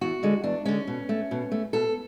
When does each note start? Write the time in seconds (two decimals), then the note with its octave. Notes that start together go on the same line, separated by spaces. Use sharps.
0.01 E2 F#4
0.23 D3 G#3
0.44 E2 D4
0.65 D3 G#3 C#4
0.87 B2
1.09 A3
1.31 B2
1.52 A3
1.73 B2 A4